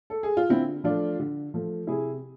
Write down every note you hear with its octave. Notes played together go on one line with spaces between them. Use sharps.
A4
G#4
F4
D3 C4 E4
F3 A3 D4 F4
D3
F3 A3
C3 E4 G#4